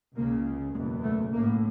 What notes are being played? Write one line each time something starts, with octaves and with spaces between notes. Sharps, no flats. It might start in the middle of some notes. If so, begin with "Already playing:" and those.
C#2 C#3 A#3
F#1 E2 B2 G#3
A3
B1 A2 A#3